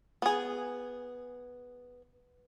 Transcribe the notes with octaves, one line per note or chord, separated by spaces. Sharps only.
B3 G#4